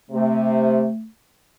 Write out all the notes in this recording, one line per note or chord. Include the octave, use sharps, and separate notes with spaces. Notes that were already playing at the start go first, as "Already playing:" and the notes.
C3 A3